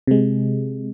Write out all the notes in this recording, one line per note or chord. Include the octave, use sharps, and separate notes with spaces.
C3 G#3